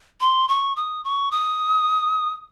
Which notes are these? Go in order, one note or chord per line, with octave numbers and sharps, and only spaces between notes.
C6
C#6
D#6
C#6
D#6